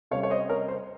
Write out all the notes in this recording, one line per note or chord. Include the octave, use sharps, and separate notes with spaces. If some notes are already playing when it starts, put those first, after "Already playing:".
C3 G3 C#4 C#5 F5
C#5
C5 D#5
A#4 C#5
C5